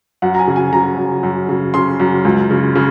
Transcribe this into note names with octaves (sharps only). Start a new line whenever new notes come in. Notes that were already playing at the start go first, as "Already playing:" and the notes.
F#2 F#5
A#5
G#5
C#3
G#5
C#3 A#5
F#2
F#2
C#3
C#3 C6
F#2
C#2
C#3
C#3